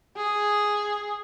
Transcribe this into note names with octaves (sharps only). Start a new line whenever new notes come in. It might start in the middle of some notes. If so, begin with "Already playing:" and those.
G#4